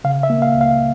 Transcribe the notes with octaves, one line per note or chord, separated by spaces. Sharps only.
C#3 F5
E5
A#3
F5
C#2
F5